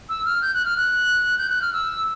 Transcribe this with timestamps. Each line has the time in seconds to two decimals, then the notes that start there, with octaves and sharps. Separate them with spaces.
0.09 E6
0.25 F6
0.42 G6
0.54 F#6
0.65 F6
0.77 F#6
1.38 G6
1.50 F#6
1.62 F6
1.73 E6